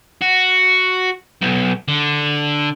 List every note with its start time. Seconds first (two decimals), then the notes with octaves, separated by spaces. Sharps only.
0.22 F#4
1.42 B1
1.88 D3